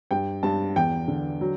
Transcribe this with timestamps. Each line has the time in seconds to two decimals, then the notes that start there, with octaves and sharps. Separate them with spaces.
0.11 G2 G5
0.43 G2 A5
0.76 E2 G5
1.08 D3
1.41 F#3